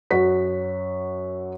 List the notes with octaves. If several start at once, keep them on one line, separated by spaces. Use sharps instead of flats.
F#2 F#3 C#5 F#5 B6